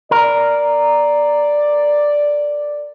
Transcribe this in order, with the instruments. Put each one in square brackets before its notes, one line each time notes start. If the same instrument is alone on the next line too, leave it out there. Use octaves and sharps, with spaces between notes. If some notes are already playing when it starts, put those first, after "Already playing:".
[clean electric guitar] A#4 [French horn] D5